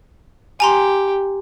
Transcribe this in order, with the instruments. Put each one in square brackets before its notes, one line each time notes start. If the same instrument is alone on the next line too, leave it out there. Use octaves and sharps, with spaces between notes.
[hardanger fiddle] G4 [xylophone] G#5 A#5 C6